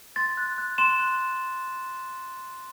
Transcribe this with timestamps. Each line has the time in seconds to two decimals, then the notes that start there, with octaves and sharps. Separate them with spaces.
0.16 C6 A6
0.37 F#6
0.58 F#6
0.78 C6 E7
0.99 F#6
1.20 F#6